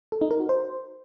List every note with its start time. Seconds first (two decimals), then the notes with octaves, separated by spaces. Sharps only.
0.12 A4
0.21 D#4
0.31 A#4
0.40 F#4
0.49 C5